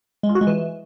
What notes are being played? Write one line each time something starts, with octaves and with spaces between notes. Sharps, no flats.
G#3
F4
F#4
G#3
E3